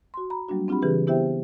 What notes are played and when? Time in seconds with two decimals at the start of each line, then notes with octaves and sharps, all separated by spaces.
0.14 F#4 C6
0.30 A#5 B5
0.49 F#3 G3 A#3 D4 F#4
0.68 C4 D4 F4 G4 F#5 B5
0.82 C#3 E3 G4 G#4 B4
1.07 B3 E4 G4 C5 E5 G5